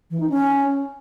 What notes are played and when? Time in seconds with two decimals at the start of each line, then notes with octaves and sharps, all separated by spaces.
0.11 E3
0.20 D#4
0.30 C#4